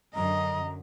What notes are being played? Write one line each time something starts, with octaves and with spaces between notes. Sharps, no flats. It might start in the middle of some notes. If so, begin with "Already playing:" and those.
F#2 D3 D#5 A#5